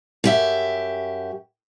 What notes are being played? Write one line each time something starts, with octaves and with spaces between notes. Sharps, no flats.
F#2 G4 E5